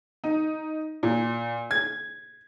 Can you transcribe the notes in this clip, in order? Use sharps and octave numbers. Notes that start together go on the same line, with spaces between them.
D#4
A#2
G#6